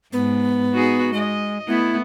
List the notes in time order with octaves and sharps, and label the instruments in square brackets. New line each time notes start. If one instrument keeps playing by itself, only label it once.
[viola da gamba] G#2 [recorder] B3
[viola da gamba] D#4 F#4 G#4
[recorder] G#3 [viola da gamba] D#5
[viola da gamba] A3 B3 [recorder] E4